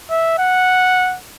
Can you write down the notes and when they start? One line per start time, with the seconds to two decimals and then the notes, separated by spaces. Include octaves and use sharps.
0.10 E5
0.38 F#5